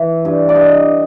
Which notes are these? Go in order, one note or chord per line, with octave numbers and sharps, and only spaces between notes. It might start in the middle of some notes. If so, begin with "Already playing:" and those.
Already playing: E3
G2
D5
G2 D#5